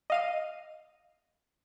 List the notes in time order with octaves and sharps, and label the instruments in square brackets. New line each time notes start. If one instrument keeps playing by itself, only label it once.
[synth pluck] D#5 F5 D#7